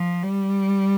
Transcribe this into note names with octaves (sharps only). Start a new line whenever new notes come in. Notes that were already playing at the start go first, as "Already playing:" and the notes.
Already playing: F3
G3